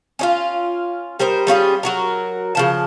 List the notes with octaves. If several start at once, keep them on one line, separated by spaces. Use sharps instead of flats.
C#4 D#4 F4
G3 A#4 C5 D#5
G3 C#4 F4 G#4
F#3 F#4 A#4
C#3 F3 A5